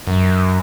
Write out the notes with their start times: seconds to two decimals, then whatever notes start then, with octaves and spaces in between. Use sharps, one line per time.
0.07 F#2